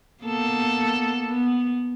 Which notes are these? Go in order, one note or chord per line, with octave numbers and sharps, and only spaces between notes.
A#3 B3 A4
B3